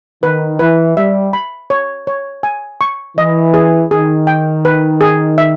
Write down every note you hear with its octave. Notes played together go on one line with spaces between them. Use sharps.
D#3 B4
E3 B4
G3 E5
B5
C#5
C#5
G#5
C#6
E3 D#5
G#4
D#3 G#4
G5
B4
G#4
E5